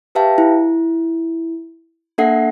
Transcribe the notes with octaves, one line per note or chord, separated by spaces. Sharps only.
G4 B4 E5 F5 G5 A5
E4
A#3 D4 A4 E5 F#5 C7